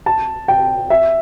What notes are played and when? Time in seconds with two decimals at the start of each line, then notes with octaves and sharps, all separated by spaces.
0.06 A5
0.48 G5
0.90 E5